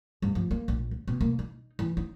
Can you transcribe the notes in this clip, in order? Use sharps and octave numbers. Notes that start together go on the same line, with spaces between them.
G2
F3
A#3
A#1
D#2
B2
A#3
D#4
E3
D#4